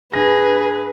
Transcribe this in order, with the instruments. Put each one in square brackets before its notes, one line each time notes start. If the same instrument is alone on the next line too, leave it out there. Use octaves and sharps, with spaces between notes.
[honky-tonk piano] G2 A#6 [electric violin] G#4 [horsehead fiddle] B4